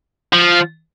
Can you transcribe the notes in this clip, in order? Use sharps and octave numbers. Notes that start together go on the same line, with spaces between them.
F3